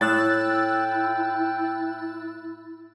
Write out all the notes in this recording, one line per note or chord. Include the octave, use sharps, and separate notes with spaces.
A2 E4 G5 E6 F#6 A6